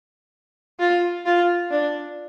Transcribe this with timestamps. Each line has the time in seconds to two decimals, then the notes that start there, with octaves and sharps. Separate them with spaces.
0.79 F4
1.26 F4
1.71 D4